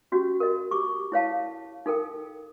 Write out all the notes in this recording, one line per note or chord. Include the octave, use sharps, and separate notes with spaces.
C#4 F#4 G4
A#4 D#5
G4 C#6 D6
E4 C#5 F5 A5
D#4 A4 A#4 G5